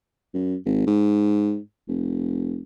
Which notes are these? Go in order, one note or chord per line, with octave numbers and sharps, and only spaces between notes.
F#2
G#1
G#2
F1